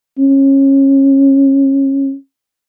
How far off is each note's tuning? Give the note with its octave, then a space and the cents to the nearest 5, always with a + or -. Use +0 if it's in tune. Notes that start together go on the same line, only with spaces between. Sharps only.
C#4 -25